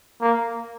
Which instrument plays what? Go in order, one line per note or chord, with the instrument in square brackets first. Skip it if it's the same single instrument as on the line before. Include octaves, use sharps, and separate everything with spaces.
[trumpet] A#3